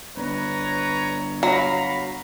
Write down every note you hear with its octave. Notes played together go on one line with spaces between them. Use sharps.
G1 B4 C#5 A#5
F#3 F5 A#5 B5